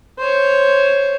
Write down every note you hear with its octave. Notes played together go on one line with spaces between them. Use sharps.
C5 C#5